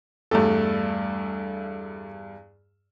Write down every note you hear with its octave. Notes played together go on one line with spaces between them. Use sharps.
E2 G2 A3 A4